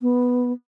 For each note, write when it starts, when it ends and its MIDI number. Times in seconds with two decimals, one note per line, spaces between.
0.01 0.52 59